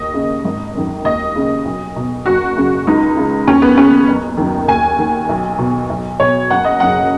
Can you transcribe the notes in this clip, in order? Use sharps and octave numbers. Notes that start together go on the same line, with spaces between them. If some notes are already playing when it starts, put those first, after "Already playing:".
Already playing: D#2 D#5
C#3
G#1
F#2 D#3
D#2 D#5
C#3
B1
B2
F#1 F#4
F#2 C#3
C#2 D#4
C#3
D#2 C#4
B3
C#3 C#4
F#1
F#2 D#3
D#2 G#5
D#3
B1
B2
B1
B2 C#5
F#1 F#5
D#5
F#2 C#3 F#5